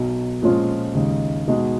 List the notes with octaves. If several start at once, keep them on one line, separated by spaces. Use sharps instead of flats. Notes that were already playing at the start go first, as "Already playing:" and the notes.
Already playing: B1 B2 F#3
A#2 F3 G#3 C#4 F4
D#2 C#3 G#3 D#4
B2 G#3 D#4 F#4